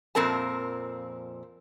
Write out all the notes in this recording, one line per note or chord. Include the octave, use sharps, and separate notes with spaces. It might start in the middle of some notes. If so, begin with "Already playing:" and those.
F2 A#2 F3 C4 A#4 A5